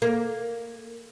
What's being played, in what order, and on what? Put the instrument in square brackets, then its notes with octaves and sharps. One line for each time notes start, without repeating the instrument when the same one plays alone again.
[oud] A#3